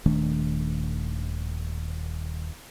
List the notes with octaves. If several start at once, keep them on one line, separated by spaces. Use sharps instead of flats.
D#1 D#3 A3 D4